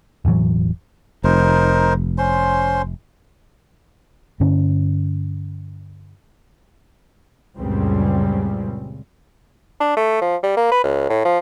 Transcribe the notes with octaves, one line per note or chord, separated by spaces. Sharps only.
E1 A2 E3 F#3
F1 D#4 A#4 C5
C#4 C5 C6
G2 D3 C#4
C#2 F#2 A#2 C#3 G3 C4
D4
A3
F3
G3
A#3
B4
C#2
A2
F3